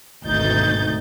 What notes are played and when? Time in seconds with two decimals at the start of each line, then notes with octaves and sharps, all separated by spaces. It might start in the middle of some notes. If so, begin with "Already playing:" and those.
0.24 G#1 D2 B2 D#4 G6 A6